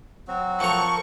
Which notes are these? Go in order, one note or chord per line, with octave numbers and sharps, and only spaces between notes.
F#3 C4 F#4
F3 A4 A#4 A#5 C#6